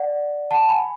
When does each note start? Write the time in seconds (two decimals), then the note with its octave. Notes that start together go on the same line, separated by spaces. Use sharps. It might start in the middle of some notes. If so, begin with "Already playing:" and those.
Already playing: D5 F#5
0.51 F#5 A5
0.69 G#5 B5